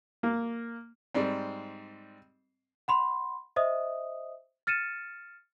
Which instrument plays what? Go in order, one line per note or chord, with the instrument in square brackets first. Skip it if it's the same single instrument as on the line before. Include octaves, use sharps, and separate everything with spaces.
[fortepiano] A#3
G#2 G3 C4
[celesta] F#5 B5 C6
C5 D#5 E5 D#6
F6 A6 C#7 D#7 E7